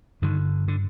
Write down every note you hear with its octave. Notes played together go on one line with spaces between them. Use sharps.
G2 D3 D#3
D3